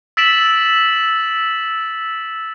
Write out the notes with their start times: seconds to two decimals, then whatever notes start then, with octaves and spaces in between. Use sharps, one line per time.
0.17 E6 A6 B6 D7 E7 F#7